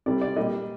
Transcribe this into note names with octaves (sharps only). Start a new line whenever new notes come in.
C3 G3 D5
D5
A#2 G3 D#5